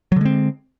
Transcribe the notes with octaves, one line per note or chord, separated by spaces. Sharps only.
D3 F#3 G#3 C4